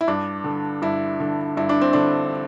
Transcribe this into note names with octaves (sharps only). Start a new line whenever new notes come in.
E4
G2 D4
D3
G2 E4
D3
G2 E4
D4
C4
D3 D4